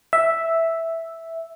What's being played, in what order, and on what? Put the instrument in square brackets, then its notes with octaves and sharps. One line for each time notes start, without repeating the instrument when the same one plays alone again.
[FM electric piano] E5